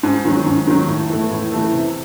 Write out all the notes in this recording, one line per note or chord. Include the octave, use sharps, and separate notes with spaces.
G#2
D#3 F#3
G#2
D#3 F#3
A2
E3 A3
A2
E3 A3
C3